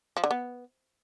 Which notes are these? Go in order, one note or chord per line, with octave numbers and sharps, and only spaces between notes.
F3
D3
B3